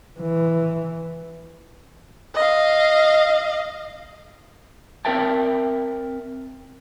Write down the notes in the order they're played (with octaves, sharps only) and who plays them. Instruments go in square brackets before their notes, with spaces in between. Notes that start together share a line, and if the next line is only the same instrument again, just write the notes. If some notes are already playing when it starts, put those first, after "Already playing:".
[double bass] E3
[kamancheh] D#5 F5
[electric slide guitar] C4 A#4 E5 G5 A5